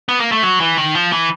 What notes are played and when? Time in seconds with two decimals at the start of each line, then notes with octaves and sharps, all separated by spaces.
0.09 B3
0.20 A#3
0.32 A3
0.43 F#3
0.60 E3
0.78 D#3
0.95 F3
1.12 E3